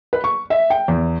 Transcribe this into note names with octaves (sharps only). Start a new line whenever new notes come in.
B4
C#6
E5
G5
E2